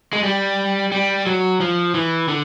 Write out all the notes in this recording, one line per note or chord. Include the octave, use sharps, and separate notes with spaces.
G#3
G3
G3
F#3
F3
E3
D3